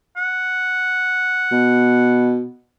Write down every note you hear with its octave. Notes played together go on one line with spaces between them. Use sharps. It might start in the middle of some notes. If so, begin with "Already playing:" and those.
F#5
B2